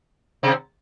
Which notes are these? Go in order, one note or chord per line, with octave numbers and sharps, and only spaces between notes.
C3 C4